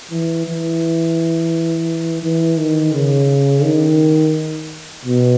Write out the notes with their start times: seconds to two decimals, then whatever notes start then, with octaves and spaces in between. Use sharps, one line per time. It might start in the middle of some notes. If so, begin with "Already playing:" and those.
0.11 E3
0.45 E3
2.23 E3
2.57 D#3
2.93 C#3
3.63 D#3
5.05 B2